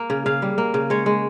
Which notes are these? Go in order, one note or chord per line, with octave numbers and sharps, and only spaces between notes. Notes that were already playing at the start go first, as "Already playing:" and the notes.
Already playing: A#3
C#3
C#3 F5
G3
A#3
C#3
G#3 C#5
G#3